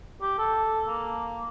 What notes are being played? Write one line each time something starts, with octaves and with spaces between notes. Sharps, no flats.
G4
A4
A#3